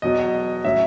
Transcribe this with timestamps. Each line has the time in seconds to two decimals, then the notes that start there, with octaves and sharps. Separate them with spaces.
0.02 E2 B2 F#3 D#5
0.64 A2 F#3 C#4 E5